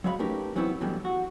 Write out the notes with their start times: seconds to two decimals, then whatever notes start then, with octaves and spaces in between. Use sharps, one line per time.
0.04 F#3 G#3 C#5 F5 B5
0.19 A3 C#4 D#4 G4 A#4 B4
0.56 E3 F#3 B3 C4 E4 C#5
0.81 G2 B2 E3 F#3 G3 A3
1.05 F#4